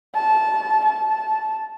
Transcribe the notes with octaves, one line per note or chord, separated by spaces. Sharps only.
A5
A5